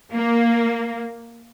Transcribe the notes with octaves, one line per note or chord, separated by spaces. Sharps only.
A#3